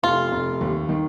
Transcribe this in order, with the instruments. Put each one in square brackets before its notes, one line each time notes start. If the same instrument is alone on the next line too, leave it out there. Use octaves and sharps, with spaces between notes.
[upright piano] F1 [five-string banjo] F4
[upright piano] F1
D#2
D#3